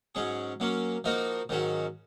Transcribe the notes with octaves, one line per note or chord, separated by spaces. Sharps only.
G#2 F#3 C#4 G#4
F#3 A#3 C#4
F3 A#3 D#4 F#4 A#4
G#2 D#3 F#3 C#4 F#4